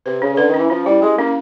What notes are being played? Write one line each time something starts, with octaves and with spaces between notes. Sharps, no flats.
C3 B4
C#3 C#4
C#3
D3 B4
D#3
E3 C#4
F3 C#4
G3 E4
G#3 G4
A#3 C#4